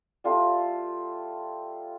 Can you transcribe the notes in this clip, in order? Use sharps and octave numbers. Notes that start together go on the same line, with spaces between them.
G3 A3 F4